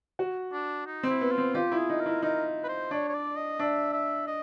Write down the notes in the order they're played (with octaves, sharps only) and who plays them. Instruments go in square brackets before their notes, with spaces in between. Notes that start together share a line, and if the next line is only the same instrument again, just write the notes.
[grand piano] F#4
[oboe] D4
D#4
[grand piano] C4
[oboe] E4
[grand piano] B3
[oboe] F4
[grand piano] C4
[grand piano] F4 [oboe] G4
[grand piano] E4
[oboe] G#4
[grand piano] D#4
[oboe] A#4
[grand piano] E4
[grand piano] D#4 [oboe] A#4
[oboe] B4
C5
[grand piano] D4 [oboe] C#5
[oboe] C#5
D5
D#5
[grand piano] D4 [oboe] E5
[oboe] E5
D#5